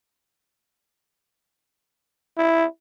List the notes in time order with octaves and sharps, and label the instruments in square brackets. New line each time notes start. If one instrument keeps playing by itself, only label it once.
[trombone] E4